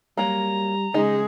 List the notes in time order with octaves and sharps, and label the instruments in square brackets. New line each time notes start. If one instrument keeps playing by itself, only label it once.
[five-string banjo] F#3 A#3 [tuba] G3 [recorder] A#5
[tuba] C#3 [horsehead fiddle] G#3 G#4 [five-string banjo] D#4